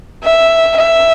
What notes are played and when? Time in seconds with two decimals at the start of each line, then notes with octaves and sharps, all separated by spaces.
0.24 E5
0.78 E5